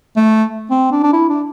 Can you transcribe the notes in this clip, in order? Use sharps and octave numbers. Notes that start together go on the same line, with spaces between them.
A3
C4
D4
D4
E4
D4